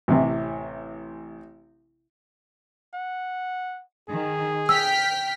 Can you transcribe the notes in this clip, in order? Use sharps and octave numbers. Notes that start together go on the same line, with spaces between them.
A1 C3 E3
F#5
D#3 G#4
G5 E6 F6 B6